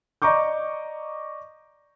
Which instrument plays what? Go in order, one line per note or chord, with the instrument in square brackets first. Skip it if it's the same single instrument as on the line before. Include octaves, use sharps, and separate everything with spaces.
[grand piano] D5 D#5 A#5 C#6 D6 G6